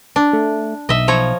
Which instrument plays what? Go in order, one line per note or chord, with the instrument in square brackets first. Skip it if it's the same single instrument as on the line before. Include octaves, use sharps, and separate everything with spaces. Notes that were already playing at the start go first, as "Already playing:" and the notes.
[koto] D4
[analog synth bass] A3
[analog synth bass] B1 [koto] D#5 E5
[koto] F3 C#5 A#5